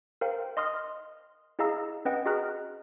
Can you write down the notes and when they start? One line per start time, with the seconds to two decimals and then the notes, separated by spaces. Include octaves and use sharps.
0.21 A#4 C5 F5 G5
0.57 D#5 C6 D#6 F6
1.59 E4 G#4 D#5 F5 A#5 E6
2.05 C#4 B4 D#5 F#5 G5
2.26 F#4 G#4 D#5 A#5 F6 F#6